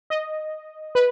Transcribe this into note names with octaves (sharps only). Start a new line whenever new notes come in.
D#5
B4